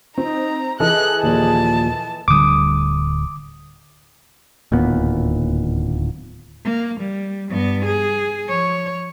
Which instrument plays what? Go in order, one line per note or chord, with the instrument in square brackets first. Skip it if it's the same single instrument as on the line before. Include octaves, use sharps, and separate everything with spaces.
[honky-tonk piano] C4 [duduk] D#4 [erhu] A#5
[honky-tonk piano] E3 A4 D#5 [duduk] G#4 [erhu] F#6
[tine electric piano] D#2 A#2 F3 [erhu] A5
[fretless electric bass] D1 D3 G3 [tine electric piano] D6 D#6
[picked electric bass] D1 D#2 A#2 B3
[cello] A#3
G3
G2 B3
G#4
F3 C#5